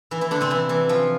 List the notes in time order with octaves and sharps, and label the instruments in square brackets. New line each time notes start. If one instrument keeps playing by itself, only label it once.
[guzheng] E3 E4
E3 E4
D3 D4
C3 C4
E3 E4
E3 E4
F3 F4